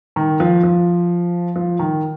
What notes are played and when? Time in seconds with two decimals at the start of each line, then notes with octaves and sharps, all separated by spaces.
0.16 D#3
0.40 F3
0.63 F3
1.56 F3
1.79 D#3